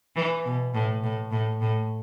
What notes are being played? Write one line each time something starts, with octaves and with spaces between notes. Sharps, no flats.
E3
B2
A2
A2
A2
A2